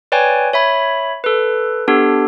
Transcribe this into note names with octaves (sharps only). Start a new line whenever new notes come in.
B4 C#5 D5 G5 G#5
C#5 E5 B5
A4 B4
B3 D4 G4 A4